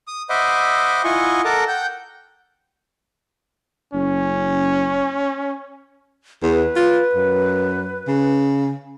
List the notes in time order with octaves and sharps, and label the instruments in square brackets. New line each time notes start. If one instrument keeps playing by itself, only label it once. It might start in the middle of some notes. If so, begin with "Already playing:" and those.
[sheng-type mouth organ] D#6
C5 D#5 E5 F#5 B5 D6
E4 F4 D#5 F#5 G#5 C#6
A4 A#4 F#5 A5 A#5 D6
F#5 G5 G6
[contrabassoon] F#1 [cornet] C#4
[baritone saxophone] E2 [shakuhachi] B4
[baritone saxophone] F4
F#2
C#3